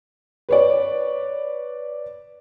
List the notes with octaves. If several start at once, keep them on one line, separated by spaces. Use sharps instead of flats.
B4 C#5 D5